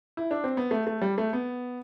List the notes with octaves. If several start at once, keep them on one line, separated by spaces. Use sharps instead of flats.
E4
D4
C4
B3
A3
A3
G3
A3
B3